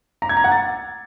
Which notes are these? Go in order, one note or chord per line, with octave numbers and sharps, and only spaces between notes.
A#5
G#6
A#5
F#5
A6